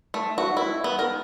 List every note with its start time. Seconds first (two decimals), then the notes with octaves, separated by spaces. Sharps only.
0.14 A3
0.38 F#4
0.57 E4
0.84 B3
0.99 A#4